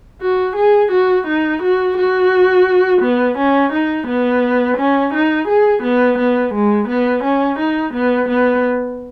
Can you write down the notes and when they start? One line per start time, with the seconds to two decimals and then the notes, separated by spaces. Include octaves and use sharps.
0.22 F#4
0.56 G#4
0.92 F#4
1.27 D#4
1.62 F#4
1.97 F#4
3.02 B3
3.38 C#4
3.73 D#4
4.07 B3
4.78 C#4
5.14 D#4
5.48 G#4
5.83 B3
6.19 B3
6.54 G#3
6.88 B3
7.24 C#4
7.59 D#4
7.94 B3
8.29 B3